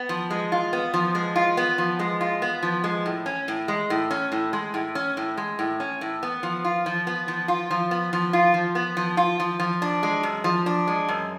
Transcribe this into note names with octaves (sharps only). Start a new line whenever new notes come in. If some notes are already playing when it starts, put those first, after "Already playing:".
Already playing: B3
F3
G#3
F4
B3
F3
G#3
F4
B3
F3
G#3
F4
B3
F3
G#3
A2
C#4
A2
G#3
A2
C#4
A2
G#3
A2
C#4
A2
G#3
A2
C#4
A2
B3
F3
F4
F3
B3
F3
F4
F3
B3
F3
F4
F3
B3
F3
F4
F3
F3
D4
G#3
F#2
F3
D4
G#3
F#2